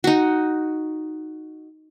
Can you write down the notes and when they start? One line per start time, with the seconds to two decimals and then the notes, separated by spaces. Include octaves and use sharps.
0.04 D#4 F#4